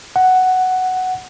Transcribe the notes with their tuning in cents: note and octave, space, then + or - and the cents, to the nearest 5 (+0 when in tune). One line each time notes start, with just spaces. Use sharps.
F#5 +5